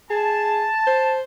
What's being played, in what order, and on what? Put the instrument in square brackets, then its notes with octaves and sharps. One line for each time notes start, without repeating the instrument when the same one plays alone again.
[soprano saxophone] G#4 [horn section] A5
[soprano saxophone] C5